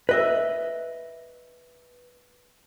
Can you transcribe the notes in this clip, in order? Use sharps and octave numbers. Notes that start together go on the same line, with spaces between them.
B4 D#5 E5